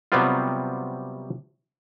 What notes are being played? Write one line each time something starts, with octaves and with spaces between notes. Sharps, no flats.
C3 F#3 G3 B3 C4 F4